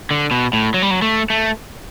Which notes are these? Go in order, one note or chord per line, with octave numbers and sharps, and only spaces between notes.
D3
B2
A2
F#3
G3
F#3
A3
A3